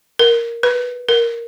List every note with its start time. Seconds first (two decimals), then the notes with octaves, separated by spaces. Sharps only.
0.19 A#4
0.63 B4
1.09 A#4